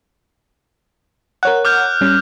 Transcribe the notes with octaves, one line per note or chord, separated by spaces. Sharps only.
A#4 C#5 F#5 F#6
D6 F6 G6
G3 C#4